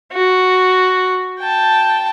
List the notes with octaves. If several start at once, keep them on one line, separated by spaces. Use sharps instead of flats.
F#4
G5 A5